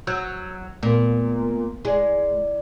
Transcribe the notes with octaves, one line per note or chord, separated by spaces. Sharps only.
F#3 E6 G6 G#6
A#2 A3 B3 A#4
G#3 E4 D5